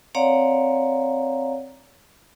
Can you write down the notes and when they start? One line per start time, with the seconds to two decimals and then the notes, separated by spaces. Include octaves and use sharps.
0.15 C4 C#5 D5 F5 F#5 A#5